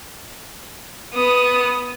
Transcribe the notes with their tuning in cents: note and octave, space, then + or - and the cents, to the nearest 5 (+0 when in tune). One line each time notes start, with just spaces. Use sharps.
B3 +0 D#6 +0